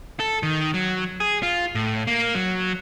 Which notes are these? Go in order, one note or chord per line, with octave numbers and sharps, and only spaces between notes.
A4
D#3
F#3
G#4
F4
A2
A#3
F#3